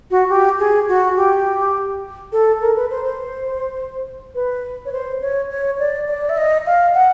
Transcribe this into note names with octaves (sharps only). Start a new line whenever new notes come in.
F#4
G4
G#4
F#4
G4
A4
A#4
B4
C5
C5
B4
C#5
C5
C#5
C#5
D5
D5
E5
D#5
F5
F#5